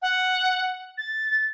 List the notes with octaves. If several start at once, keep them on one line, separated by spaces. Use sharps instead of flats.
F#5
A6